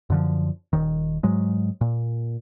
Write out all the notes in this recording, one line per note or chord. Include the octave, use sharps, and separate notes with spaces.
F#2 D3 F3
D#1 D#3
G#2 F#3 G#3
A#2